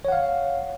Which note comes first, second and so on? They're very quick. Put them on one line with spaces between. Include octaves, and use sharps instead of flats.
C#5 F#5 F5